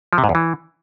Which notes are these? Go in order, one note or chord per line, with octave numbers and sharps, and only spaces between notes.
F3
C3
G#2
E2
E3